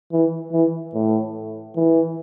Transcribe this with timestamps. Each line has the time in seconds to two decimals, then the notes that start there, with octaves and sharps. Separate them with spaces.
0.12 E3
0.52 E3
0.94 A2
1.76 E3